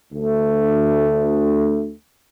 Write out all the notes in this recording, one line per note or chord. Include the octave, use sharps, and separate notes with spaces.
D2 A3